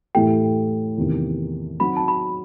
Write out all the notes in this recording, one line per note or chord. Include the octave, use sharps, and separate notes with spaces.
A2 E3 A3 E4 G4 G5
E2 C3 D#3
F#3 C4 D#4 F#4 B5
A5
B5